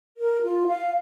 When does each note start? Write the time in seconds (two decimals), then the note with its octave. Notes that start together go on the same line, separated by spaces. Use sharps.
0.18 A#4
0.42 F4
0.67 F5